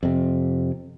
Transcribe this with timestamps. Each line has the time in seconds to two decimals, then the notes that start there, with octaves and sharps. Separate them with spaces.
0.03 F2 C3